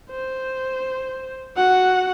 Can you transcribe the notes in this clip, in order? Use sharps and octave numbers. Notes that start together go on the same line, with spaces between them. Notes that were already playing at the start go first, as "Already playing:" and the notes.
C5
F#4 F#5